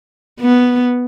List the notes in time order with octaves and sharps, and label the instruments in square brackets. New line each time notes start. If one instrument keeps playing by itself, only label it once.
[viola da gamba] B3